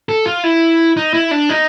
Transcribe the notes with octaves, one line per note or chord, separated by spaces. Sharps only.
A4
F4
E4
D#4
E4
D4
D#4